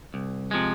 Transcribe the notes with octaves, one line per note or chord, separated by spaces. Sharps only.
C2
C3 F3 G#3